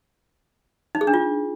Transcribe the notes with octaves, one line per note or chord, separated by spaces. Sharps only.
D#4
G#4
D4
F4